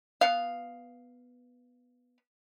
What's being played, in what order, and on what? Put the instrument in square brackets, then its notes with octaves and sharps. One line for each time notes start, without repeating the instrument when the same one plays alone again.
[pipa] B3 F5